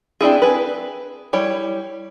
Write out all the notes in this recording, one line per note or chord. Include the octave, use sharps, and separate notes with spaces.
C4 D4 E4 G#4
G#4 B4
G3 E4 C#5